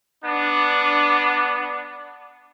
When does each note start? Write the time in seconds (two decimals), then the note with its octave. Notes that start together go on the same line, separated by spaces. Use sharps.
0.24 B3 D4